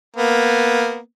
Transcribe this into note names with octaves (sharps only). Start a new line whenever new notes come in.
A#3 B3